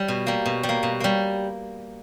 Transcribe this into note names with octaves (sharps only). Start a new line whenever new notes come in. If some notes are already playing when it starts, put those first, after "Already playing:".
Already playing: G3
B2
G3 A#3
B2
G3
A#3
B2
G3 A#3